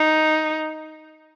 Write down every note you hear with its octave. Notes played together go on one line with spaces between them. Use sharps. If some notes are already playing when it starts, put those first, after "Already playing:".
Already playing: D#4